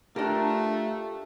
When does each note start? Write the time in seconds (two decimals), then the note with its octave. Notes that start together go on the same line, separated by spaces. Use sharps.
0.16 A3 D4 F4 G4 A#4 D5 A#5